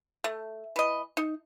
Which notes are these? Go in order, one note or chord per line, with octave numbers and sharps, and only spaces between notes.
A3
E3 D#5
D#4